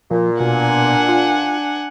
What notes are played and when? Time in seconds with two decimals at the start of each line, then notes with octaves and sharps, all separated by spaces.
0.11 A#2 F3
0.40 B2 D4 F#5 G#5
1.09 F4